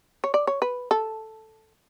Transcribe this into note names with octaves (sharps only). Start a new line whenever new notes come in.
C#5
D5
C#5
B4
A4